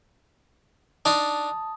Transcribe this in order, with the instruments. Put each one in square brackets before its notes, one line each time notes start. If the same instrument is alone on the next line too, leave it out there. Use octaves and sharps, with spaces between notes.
[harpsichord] D4 D#4 C6 [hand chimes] A5 [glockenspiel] D#6